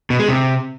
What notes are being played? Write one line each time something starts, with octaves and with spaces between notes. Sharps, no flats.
B2
G#3
C3